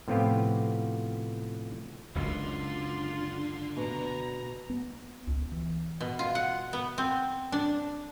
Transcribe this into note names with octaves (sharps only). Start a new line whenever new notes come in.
A2 C3 F3 B3 F4 G4
F#1 C#2 F#2 D3 F4 C6
B2 A#5
B3
C#2
E3
B2
F4
F#5
B3
C4
D4